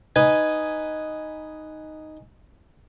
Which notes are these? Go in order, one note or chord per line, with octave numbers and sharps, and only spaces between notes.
D#4 B4 G#5